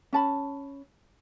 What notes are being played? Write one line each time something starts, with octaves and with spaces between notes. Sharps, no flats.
C#4 A5 B5